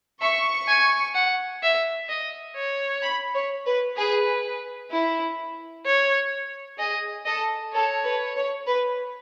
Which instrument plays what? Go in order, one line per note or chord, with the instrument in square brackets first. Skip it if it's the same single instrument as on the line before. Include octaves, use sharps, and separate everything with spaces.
[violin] E5 [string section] C#6
[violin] G#5
F#5
E5
D#5
C#5
[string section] B5
C#5
B4
[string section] G#4 [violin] B4
[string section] E4
[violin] C#5
[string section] G#4 [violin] D#5
[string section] A4 [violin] D#5
[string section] A4 [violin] C#5
[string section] B4
C#5
B4